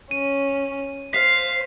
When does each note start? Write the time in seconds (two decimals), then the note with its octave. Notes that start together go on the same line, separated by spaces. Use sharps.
0.11 C#4 D#7
1.13 C5 F5 B6 C7